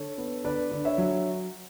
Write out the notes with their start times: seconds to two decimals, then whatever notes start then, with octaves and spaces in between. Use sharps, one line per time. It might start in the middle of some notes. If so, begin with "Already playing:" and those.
Already playing: D3 A4 C#5
0.18 B3
0.44 D3 B4 D5
0.71 D3
0.85 C#5 E5
0.98 F#3